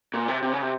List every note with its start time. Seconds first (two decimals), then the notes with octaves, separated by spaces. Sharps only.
0.14 A#2
0.28 C3
0.42 C3
0.53 C#3
0.62 C3